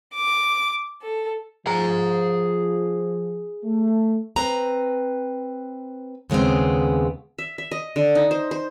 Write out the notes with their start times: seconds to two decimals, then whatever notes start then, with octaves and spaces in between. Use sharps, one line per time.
0.15 D6
1.03 A4
1.67 F3 G#4 A#5
3.64 A3
4.36 C4 B4 A#5
6.30 D#2 C#3 G#3 B3 C4
7.38 E5
7.58 E5
7.71 D#5
7.96 D3
8.15 D#4
8.31 C5
8.51 C5